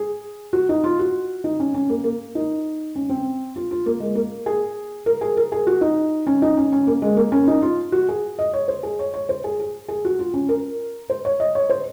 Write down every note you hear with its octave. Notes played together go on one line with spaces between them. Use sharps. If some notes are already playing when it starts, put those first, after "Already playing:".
Already playing: G#4
F#4
D#4
F4
F#4
D#4
C#4
C#4
A#3
A#3
D#4
C#4
C4
F4
F4
A#3
G#3
A#3
G#4
A#4
G#4
A#4
G#4
F#4
D#4
C#4
D#4
C#4
C#4
A#3
G#3
A#3
C#4
D#4
F4
F#4
G#4
D#5
C#5
C5
G#4
C#5
C#5
C5
G#4
G#4
G#4
F#4
F4
C#4
A#4
C5
C#5
D#5
C#5
C5